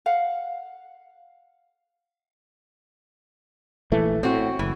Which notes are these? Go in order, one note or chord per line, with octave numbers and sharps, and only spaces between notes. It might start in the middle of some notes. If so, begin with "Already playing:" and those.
F5 F#5
A#1 E3 A3
A2 C4 F#4
F#1 E3